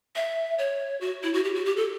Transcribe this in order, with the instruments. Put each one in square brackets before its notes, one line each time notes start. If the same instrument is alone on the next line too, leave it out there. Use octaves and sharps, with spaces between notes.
[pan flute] E5
C#5
F#4
E4
F#4
G4
F#4
G4
A4